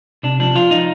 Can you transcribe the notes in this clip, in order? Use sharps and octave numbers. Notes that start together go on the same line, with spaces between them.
C3 D4
F3 D4
F3 F4
F3 D#4